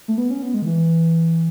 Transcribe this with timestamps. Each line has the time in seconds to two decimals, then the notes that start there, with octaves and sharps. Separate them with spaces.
0.08 A3
0.18 B3
0.30 C#4
0.42 B3
0.54 G#3
0.62 D#3
0.66 E3